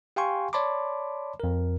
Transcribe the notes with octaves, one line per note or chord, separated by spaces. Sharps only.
G4 F5 G5 G#5 C6 C#6
C#5 D5 A5 B5 C6 D6
F2 A#4